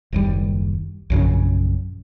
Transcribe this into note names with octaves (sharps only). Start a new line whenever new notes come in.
F#1 D#2 G3
A#1 F#2 C#3